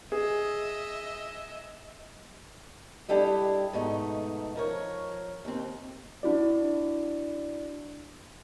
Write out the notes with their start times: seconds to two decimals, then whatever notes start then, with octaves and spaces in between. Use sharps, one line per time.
0.12 G#4 D#5 E5
3.09 G3 D4 E4 G4 A4 D#5
3.73 G#2 B2 A3 D#4
4.56 F3 A#4 C#5
5.45 D#2 C4
6.23 D4 E4 F#4 D5